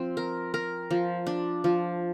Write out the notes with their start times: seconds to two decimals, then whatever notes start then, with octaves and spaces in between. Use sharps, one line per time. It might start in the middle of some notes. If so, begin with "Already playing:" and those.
Already playing: F3 C4
0.17 A#4
0.54 A#4
0.91 F3
1.27 D4
1.64 F3